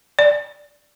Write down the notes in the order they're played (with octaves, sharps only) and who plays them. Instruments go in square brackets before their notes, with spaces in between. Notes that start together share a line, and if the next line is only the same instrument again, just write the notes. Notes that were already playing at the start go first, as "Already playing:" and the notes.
[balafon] D5